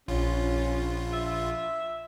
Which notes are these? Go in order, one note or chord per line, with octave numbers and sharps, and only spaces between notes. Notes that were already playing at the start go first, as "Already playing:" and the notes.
A#1 C#4 F4
E5